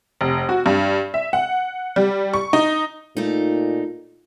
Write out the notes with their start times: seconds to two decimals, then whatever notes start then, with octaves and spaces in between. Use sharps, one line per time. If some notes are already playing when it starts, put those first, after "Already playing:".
0.21 F1
0.49 F#4
0.66 G2
1.14 E5
1.33 F#5
1.96 G3
2.34 C#6
2.53 D#4
3.17 A#2 A3 D#4